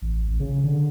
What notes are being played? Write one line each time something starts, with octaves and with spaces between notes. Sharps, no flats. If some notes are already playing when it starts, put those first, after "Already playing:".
A1
A1
C#3
D3